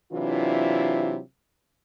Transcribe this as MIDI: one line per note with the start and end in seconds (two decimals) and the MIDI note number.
0.12 1.18 48
0.12 1.18 52
0.12 1.18 54
0.12 1.18 62
0.12 1.18 64
0.12 1.18 65